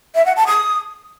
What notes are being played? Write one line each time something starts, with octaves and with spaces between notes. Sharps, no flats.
E5
F#5
A5
D#6